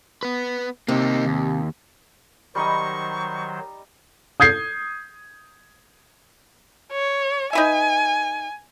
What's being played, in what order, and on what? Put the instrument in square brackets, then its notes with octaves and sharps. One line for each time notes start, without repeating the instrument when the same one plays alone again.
[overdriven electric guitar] B3 B4
[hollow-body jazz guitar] C3 [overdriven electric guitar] A#3 D#4
[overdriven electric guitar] D#2
[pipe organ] D#3 F#3 C5 [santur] G3 D#4 D#5 [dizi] C#6
[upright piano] D#6 G6 G#6 C7
[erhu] C#5
[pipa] D#4 B4 E5 [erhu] G#5